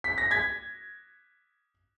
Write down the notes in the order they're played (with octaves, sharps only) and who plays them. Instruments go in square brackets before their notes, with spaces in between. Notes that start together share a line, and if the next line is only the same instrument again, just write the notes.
[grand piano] B6
A#6
G#6 B6